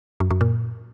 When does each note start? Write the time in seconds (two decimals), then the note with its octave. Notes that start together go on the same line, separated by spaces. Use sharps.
0.20 F#2
0.31 F#2
0.41 A#2